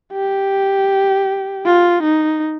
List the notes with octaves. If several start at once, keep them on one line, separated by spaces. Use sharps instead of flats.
G4
F4
D#4